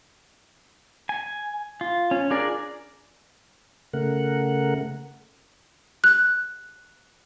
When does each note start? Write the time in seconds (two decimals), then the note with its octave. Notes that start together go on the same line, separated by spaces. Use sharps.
1.09 G#5
1.81 F4
2.11 C#4
2.31 D4 F4 G#4 A#4 D5
3.93 C#3 A3 A#4 F#5
6.04 F#6